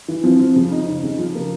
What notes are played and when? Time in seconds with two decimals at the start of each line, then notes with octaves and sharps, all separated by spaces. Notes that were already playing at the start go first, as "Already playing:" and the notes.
0.08 E3
0.24 F3 C4
0.39 F3
0.56 C#3
0.72 D#4
0.88 D#4
1.04 C#3
1.19 F3
1.35 A#3